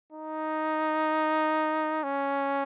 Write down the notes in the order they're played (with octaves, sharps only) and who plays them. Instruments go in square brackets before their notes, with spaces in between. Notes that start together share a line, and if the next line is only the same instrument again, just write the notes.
[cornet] D#4
C#4